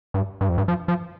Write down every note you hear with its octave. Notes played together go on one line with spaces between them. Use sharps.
G2
G2
F2
G2
F3
F3